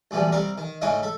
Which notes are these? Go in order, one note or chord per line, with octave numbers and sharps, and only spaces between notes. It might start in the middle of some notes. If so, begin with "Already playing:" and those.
D2 A#2 E3 F3 G3
C3 G3 C4 A#4 F5 A#5
D#3
G#2 C#3 G#3 A3 D#4 E4
A4 E5